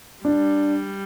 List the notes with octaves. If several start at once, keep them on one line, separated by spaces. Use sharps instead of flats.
G3 D4